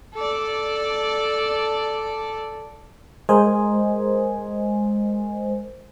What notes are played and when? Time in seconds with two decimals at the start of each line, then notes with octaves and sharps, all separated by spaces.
0.15 A4 D5
3.29 G#3 A#4 C5 D#5 G#5